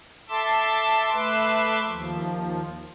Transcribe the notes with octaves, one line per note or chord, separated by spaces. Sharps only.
A4 E5 A5 C6 D6 E6
A3 B4 E5 C6 D6 E6
D#2 F3